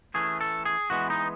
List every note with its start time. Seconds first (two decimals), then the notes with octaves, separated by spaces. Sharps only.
0.14 E3 A3 C#4 G#4
0.41 A4
0.65 G#4
0.90 E3 G#3 B3 F#4
1.10 D#4